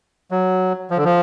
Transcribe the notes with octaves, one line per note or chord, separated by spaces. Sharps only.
F#3
F3
D3
F3